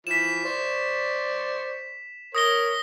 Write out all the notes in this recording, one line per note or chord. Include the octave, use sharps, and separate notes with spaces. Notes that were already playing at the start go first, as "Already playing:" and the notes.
E3 F3 B6 E7
C5 D5 C#6
A#4 C#5 D#6 A#6 G7